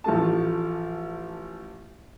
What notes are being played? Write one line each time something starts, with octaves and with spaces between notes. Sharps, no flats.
A1 F3 A3 A5